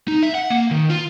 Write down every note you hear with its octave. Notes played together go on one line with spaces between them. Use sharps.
D#4
E5
F#5
A#3
D#3
F4